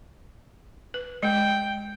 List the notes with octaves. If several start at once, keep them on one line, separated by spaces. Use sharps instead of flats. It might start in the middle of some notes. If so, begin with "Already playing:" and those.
B4
G#3 G5